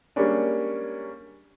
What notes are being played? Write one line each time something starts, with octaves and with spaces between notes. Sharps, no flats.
G3 G#3 A#3 C#4 D4